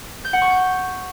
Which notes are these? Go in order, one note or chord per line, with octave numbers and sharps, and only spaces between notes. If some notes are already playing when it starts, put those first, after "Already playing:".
G6
F#5
C#6
G6